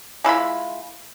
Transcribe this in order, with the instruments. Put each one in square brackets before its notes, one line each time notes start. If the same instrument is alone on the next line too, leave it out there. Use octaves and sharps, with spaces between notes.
[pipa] G#3 E4 F4 B5